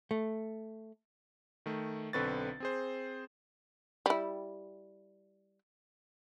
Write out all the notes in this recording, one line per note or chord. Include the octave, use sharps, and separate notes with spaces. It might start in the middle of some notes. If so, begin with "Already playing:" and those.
A3
D#3 A3
B1 D3 C4 B4 C#6 A6
C4 G#4 C5
G3 E4